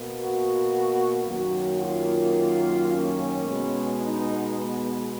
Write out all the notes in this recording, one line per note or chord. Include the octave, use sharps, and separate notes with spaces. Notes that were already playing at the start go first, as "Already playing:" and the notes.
Already playing: B2 A#3
F#4
F#2 D#3 F#3 A#3 F#4
F4
C#4
B2 G#3 B3
D#4